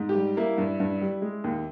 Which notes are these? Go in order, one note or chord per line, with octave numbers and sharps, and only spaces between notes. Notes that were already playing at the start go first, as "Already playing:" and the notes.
Already playing: G#2
G4
G3
A#3 E4
G2
G2
G3
G#3
D#2